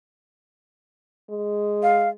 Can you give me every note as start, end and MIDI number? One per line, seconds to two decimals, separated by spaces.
1.30 2.13 56
1.83 2.09 77